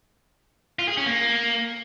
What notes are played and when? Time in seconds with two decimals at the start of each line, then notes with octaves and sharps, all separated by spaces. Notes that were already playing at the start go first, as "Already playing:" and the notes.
0.79 F4
0.88 G#4
0.97 C#4
1.07 A#3